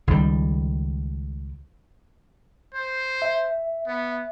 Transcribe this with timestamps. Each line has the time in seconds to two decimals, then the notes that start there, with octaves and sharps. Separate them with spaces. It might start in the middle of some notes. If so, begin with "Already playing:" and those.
0.07 C#2 D#3 G3
2.74 C5
3.22 E5
3.87 B3